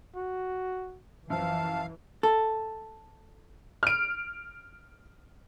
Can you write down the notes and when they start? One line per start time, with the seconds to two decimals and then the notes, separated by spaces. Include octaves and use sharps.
0.16 F#4
1.30 F#2 E3 F3 F5 A5
2.23 A4
3.83 F6 D7